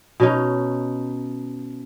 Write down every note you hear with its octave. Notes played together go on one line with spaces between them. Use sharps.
B2 C#4 D#4